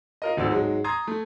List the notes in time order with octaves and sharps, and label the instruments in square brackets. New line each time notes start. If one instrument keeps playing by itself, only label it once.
[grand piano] F4 A#4 D#5
G#1 D2 D3 F3 D5 E6
G#2 F#3 G#3
A#5 C6 D#6 G#6 A6
A3